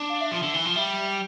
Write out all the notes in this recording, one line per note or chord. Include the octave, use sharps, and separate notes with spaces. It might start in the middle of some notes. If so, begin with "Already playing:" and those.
Already playing: D4
F5
E5
F3
D3
E3
F3
G3 E5